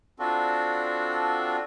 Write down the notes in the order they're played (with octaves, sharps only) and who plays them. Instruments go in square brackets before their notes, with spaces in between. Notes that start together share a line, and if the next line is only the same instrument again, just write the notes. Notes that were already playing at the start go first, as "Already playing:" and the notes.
[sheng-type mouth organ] C4 D4 F4 F#4 A4